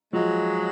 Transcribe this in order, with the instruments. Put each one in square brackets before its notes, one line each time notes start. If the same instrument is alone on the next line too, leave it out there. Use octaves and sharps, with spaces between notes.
[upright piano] F3 [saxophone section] F#3 G#3